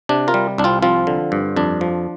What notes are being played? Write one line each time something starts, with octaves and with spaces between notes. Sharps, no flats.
C3 D4
F4 A#4
G3
C2 D4
C4 F4
F3 C4 F4
D3
G2
F2 D4
F3